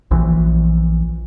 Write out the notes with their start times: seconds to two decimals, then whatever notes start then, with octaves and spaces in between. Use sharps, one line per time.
0.11 A#1 E3